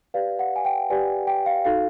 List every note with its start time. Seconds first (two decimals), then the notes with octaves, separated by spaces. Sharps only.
0.14 G4 B4 D5 F5
0.39 F#5
0.56 G#5
0.65 G5
0.90 G4 B4 D5 G#5
1.27 G5
1.46 F5
1.65 D#4 F#4 A4 F5